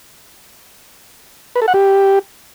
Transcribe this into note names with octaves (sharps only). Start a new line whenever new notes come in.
B4
A4
F#5
G4